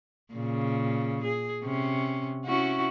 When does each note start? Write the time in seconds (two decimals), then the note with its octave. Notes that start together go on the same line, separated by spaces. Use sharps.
0.34 A#2 C#3
1.24 G#4
1.64 C3 C#4
2.45 C#4 E4 F#4